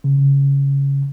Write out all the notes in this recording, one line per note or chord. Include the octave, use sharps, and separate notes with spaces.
C#3